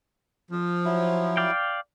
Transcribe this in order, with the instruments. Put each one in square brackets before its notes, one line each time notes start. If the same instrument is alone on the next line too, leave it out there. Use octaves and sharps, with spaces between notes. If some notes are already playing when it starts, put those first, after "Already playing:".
[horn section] F3
[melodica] F#3 E4
[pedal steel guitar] D5 F5 G5